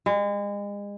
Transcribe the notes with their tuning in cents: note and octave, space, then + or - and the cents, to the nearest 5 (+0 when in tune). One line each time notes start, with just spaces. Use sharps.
G#3 -35